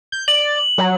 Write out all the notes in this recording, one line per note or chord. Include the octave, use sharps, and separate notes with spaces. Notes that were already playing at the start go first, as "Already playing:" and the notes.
G6
D5 F#7
F#3